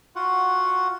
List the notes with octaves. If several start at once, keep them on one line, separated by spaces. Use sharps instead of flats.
F4 F#4 F#5